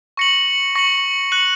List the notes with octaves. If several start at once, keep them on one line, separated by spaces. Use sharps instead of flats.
C#6 A#6 C#7 F#7
C#6 A#6 C#7 F#7
F#6 C#7 F#7